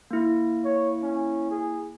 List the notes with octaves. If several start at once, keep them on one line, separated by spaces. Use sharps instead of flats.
A#3 E4
C#5
C#4
G#4